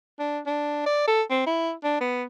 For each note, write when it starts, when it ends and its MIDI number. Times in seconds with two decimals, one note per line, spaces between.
0.19 0.40 62
0.46 0.83 62
0.86 1.06 74
1.08 1.22 69
1.30 1.44 60
1.46 1.72 64
1.84 2.00 62
2.01 2.24 59